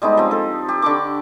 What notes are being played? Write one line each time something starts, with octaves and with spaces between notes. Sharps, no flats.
G3 G#3 B3 D#4
F3 C4
A4
G4
D3 B5 C#6 D6